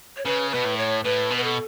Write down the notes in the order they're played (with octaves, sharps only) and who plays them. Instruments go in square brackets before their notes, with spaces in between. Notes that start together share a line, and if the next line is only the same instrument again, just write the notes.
[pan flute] C#5
[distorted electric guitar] C#3 [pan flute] B4
[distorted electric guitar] B2 [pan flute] B4
[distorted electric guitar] A2
[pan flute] C#5
[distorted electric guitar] A2 [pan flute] B4
[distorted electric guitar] B2
[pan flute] B4
A4